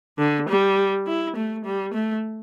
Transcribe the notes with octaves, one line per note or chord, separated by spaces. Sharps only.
D3
G3
E4
A3
G3
A3